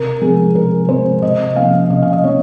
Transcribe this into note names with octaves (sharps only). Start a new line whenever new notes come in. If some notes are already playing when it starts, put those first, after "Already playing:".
Already playing: C3 A#4
F3 G#3 C4 G#4
C3 A#4
F3 G#3 C4 C5
C3 D#5
F3 A#3 C#4 F5
C3 D#5
F5
D#5
F3 A#3 C#4 C#5